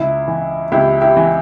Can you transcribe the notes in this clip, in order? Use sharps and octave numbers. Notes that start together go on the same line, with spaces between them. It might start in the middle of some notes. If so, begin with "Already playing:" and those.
Already playing: C#2 E4
E3
C#2 E4 G4
E4 G4
E3